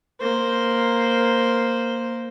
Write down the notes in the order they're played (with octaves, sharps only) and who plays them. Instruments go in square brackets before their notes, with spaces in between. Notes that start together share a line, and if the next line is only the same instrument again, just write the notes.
[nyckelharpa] A#3 C5